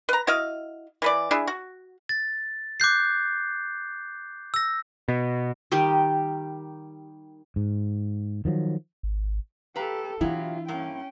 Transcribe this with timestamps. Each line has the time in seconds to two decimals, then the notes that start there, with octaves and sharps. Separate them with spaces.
0.09 B4 A#5
0.27 E4 F#4 D#5 F5
1.02 E3 B4 D5
1.31 D4 E4 G#4
1.47 F#4
2.09 A6
2.80 D6 F#6 G6 C7
4.54 E6 A#6
5.08 B2
5.72 D#3 G3 G4
7.56 G#2
8.45 D#3 F3 F#3
9.03 G#1
9.76 G4 A4 B4 F5 A#5
10.21 B2 E3 F#3 D4 E4 F4 G4
10.68 G2 A#3 C#4 G5